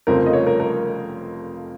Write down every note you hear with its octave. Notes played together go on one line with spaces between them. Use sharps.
F1 F2 C#3 F3 C4 A#4
D#5
C#5
A#4
A#4